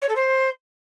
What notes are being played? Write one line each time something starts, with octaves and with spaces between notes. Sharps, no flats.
C#5
A4
C5